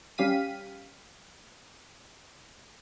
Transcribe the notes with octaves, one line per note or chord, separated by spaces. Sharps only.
G3 C#4 G4 F5 B6 D#7